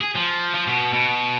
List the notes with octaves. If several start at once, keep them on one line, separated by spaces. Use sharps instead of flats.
G#4
F3
F3
B2
B2